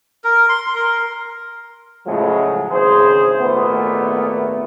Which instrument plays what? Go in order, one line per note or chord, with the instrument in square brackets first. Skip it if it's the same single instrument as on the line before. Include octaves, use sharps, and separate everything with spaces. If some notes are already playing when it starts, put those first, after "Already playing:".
[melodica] A#4
C6
A#4
[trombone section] A2 C#3 F3 F#3 G#3 A3
G#1 C#3 E3 G#4 C5
G#1 A#2 A3 B3